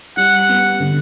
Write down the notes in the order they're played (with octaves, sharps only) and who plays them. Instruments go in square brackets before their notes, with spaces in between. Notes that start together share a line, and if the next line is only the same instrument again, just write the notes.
[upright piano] G3 [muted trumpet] F#5
[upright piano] B3
D3